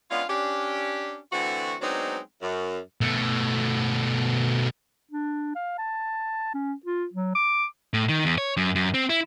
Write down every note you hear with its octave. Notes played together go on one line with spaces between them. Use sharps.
G#3 B3 C#4 D4 F4
C#4 D4 G4
D3 E3 A3 C4 F#4
F#3 G#3 B3 C4 D4 D#4
F#2
B2 A3
D4
F5
A5
C#4
F4
F#3
D6
A2
D#3
E2
C#5
F#2
F#2
C4
E4